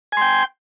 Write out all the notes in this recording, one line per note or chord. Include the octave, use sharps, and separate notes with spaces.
G5 G#5 C6